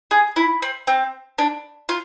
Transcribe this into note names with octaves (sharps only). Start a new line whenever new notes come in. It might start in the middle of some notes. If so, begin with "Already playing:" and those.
G#4
E4
C4
C4
D4
F4